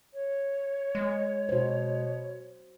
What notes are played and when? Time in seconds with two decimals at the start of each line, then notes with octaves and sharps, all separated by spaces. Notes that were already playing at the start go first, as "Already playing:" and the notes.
0.14 C#5
0.95 G#3
1.49 B2 F#4 C5